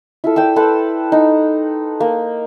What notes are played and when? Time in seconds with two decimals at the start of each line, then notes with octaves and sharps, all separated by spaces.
0.24 E4 F4 A4
0.36 D5 G5 A5 E6
0.56 A4 B4 C5 A5
1.12 D#4
2.00 A#3